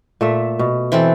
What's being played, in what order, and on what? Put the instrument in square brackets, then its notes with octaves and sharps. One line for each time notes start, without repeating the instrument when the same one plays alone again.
[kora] A#2 A3 E5
B2
[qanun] E3 C4 A4